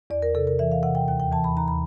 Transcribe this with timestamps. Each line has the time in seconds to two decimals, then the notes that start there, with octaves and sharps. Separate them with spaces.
0.10 E2 D5
0.22 A#4
0.35 C3 A4
0.47 A#4
0.59 E3 E5
0.72 F5
0.83 C3 F#5
0.95 G5
1.08 D#2 G5
1.20 G5
1.31 E3 A5
1.44 B5
1.57 D#2 A#5
1.68 B5